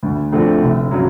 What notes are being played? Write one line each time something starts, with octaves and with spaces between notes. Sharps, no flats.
D2
D3 F3 A3 C4
F1
C#3 F#3